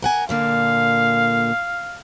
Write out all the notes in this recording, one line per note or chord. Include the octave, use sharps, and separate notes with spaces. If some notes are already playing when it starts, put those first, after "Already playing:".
A#4 F#5 G#5
A#2 D3 A#3 F5